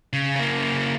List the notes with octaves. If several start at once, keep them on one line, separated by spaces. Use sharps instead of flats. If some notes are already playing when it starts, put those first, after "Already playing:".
C#3
C#3 A#3